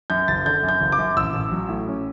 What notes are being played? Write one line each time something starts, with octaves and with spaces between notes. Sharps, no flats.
F#2 G6
F#1 A6
D3 G6
F#2
G6
F#1
D6
F#2
A1 E6
A1
F#3
A2
C#4